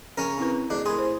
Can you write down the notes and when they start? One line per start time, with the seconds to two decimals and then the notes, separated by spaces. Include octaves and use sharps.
0.17 C#3 C#4 A#4
0.38 C4 E4 B4
0.70 D2 D4 G#4 D#5
0.86 A2 G#4 A#4 B5 C6
0.98 C5